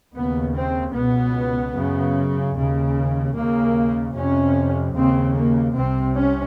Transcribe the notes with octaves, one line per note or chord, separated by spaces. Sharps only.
D#2 C#3 B3
C4
C#2 B2 B3
F#2 C#3
D#2 C#3
D#2 C#3 A#3
F2 C3 C#4
D#2 C#3 C4
A#3
C2 C3 C4
C#4